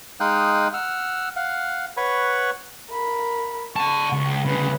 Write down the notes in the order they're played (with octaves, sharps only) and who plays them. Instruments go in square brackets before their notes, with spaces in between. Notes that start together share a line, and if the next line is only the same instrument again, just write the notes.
[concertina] G#3 D#4 F5 G5 D#6 F#6
F#5 E6 F6
F5 F#5
B4 C#5 F#5 B5 C#6
[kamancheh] A#4 B5
[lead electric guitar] F#5 A5 [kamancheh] C#6
[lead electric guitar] C#2
[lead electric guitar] D2 C#3 [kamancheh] B4